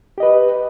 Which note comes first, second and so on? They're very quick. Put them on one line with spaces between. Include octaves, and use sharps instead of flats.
G4 D#5 B4